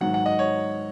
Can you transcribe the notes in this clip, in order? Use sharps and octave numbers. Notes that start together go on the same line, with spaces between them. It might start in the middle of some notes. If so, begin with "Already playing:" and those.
G#2 D#3 F#3 F#5
F#5
D#5
C#5